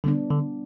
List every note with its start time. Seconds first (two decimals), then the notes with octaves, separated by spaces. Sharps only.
0.04 D3 G3 B3 D4
0.31 D3